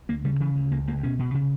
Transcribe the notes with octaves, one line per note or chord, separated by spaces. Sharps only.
D2 A#3
C#3 G3
C#3 E3
D2
C#2 A#3
C#2 A#3
B2 C#4
B2
C#3